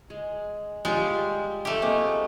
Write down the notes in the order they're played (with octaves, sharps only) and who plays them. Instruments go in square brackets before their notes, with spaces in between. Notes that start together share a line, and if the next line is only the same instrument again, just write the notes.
[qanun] G#3
[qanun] G3 F4 G4 [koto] G#3
[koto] A3 G4
[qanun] G#3 A#3 C4